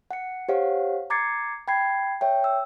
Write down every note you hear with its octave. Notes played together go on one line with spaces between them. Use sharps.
F#5 C#7
G4 C5 C#5 F5 F#5
A#5 D6 G#6 A6 C7 C#7
G5 B5 G#6 C7
C#5 E5 G5
E6